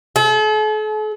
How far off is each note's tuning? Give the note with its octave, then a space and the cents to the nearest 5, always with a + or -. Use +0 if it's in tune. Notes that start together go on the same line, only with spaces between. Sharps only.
A4 -45